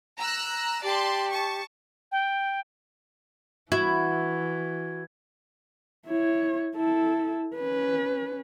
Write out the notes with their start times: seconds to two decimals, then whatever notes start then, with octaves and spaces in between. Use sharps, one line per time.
0.18 A#5 E6 F#6
0.83 G4 D5 A5 C6
1.30 A5 C#6
2.11 G5
3.72 E3 E4 F#4 G#6
6.07 E4 C#5
6.76 E4 A4
7.55 C#4 B4